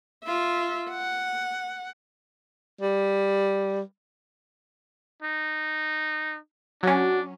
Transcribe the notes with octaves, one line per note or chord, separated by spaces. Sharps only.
F4 E5
F#5
G3
D#4
F#3 C#4 D4 F#4